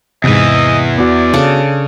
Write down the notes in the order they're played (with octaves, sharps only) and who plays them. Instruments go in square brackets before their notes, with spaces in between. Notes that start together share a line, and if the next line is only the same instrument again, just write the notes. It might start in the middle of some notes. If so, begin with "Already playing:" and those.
[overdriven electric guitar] E2 E3 [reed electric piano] G#2 C3 [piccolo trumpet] D#5
[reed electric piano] B3 F#4 [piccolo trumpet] D5
[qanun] C#3 D4 A4